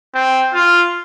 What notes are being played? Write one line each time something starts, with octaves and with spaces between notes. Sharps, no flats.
C4
F4